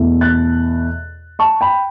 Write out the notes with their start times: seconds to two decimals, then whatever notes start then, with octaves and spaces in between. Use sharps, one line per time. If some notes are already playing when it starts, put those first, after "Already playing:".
Already playing: E2 B2 A3 E4
0.21 F#6 A6
1.39 A5 C#6
1.61 G5 B5